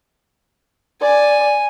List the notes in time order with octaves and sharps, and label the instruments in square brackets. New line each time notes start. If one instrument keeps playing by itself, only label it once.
[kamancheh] D5 [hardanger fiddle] G#5